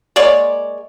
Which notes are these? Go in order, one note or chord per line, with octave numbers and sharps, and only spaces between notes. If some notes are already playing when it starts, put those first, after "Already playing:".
G#3 A#3 C#5 D5